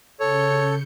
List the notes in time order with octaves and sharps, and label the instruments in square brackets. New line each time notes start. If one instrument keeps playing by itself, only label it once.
[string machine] C#3 G6 C#7 [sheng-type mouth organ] A4 [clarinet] C#5